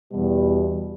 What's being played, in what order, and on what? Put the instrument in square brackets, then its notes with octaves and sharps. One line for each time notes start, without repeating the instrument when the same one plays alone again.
[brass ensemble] E2 B2 G3